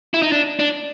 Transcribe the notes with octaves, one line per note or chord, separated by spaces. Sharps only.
E4
D#4
D4
D4